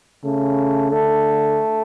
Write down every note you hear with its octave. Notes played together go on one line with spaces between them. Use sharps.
C#3 A3
D3 A3